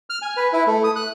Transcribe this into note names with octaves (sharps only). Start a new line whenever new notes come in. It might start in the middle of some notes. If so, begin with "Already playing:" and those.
F6
G#5
B4
E4
A3
D#6
F#6